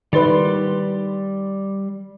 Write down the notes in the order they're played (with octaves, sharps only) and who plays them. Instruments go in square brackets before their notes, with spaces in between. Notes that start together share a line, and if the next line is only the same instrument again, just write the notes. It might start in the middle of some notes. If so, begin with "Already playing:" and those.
[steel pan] D#3 B4 [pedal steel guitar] G3 D5 C6